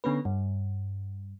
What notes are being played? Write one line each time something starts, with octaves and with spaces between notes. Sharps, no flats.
D3 B3 C#4 B4
G2